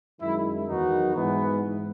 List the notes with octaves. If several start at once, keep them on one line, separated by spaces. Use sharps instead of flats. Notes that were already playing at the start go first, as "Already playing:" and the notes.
F#2 D#3 G#3 E4
E2 D#3 F#3 B3 D#4 F#4
G#2 E3 B3
G#2